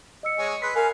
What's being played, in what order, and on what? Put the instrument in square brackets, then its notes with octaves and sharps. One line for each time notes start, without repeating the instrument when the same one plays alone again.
[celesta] D#5 E6 C#7
[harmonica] G#3 C#5 G#5
[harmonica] G#4 B4 C6 [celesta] F#6 B6
[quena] A#4 [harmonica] F5 [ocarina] G#5